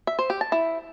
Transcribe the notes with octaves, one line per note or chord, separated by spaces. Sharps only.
E5
C5
G4
A5
E4